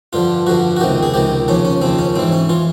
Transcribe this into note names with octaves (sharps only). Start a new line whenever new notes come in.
G2 D3 F3 F4
G2 D3 F3 F#4
F#4
C#2 C3 D#3 G4
G#4
C#2 C3 D#3 G4
D#2 C#3 F3 C#4
C#4
D#2 C#3 F3 C4
C#4
G#2 E3 C4
C#4
E3 F4